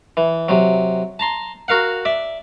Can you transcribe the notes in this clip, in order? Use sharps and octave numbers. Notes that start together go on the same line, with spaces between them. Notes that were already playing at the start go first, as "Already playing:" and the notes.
E3
C3 F#3
A5 A#5 C6
F#4 A#4 F5 F#5
D5 E5